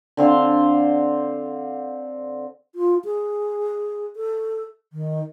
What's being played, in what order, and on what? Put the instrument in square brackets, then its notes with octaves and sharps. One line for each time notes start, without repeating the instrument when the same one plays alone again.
[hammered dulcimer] D3 C4 F5 C6
[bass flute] F4
G#4
A4
D#3